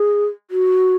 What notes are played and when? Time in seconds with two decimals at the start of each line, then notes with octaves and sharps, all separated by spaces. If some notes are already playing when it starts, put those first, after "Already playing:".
Already playing: G#4
0.51 F#4